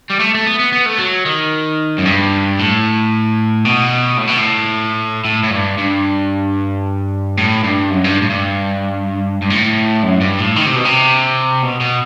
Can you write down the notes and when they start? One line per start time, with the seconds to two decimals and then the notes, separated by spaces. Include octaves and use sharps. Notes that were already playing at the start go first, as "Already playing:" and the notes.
0.10 G3
0.20 A3
0.35 A3
0.46 B3
0.59 B3
0.73 B3
0.86 A3
0.99 F#3
1.26 D#3
1.98 F#2
2.05 G2
2.59 A2
3.65 B2
4.18 A2
4.29 B2
4.39 A2
5.25 A2
5.44 A2
5.51 G2
5.78 G2
7.37 A2
7.63 G2
7.90 F#2
8.04 G2
8.22 A2
8.30 G2
9.42 G2
9.50 A2
10.03 F#2
10.21 G2
10.39 A2
10.56 D#3
10.66 C3
10.76 B2
10.85 C3
11.63 B2
11.80 B2